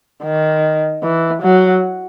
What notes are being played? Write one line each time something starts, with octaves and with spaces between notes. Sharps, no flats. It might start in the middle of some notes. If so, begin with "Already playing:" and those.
D#3
E3
F#3